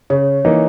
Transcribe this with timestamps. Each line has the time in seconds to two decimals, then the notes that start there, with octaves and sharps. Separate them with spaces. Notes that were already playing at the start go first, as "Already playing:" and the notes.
0.10 C#3 C#5
0.45 E3 A#3 D#4